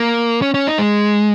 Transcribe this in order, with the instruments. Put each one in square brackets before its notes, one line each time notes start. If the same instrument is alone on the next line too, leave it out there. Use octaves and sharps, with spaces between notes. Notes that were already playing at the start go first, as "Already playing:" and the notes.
Already playing: [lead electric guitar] A#3
C#4
C#4
D#4
G#3